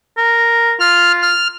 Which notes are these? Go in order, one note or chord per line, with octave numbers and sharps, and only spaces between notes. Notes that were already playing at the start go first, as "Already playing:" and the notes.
A#4
F4 F6
F6